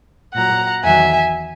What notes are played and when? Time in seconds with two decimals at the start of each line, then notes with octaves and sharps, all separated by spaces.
0.34 A#2 F#3 F#5 A#5
0.83 E2 D#3 F#3 E5 G#5